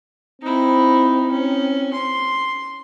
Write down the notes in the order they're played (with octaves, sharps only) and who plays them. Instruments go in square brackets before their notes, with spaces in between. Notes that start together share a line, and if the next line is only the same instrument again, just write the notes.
[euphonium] C4 [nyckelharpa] D#4 E4
[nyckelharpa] C#4
C6